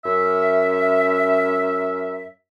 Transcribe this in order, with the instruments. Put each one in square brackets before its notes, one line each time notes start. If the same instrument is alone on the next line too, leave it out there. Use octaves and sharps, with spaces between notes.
[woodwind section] F#2 C#4 E5